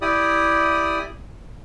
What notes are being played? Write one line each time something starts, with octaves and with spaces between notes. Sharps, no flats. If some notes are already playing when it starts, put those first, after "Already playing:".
E4 G4 D5 D#6